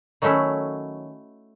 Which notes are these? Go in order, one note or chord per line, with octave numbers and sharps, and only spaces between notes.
D#3 F#3 A3 C#4 E4